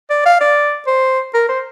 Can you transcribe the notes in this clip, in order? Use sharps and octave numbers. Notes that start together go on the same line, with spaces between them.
D5
F5
D5
C5
A#4
C5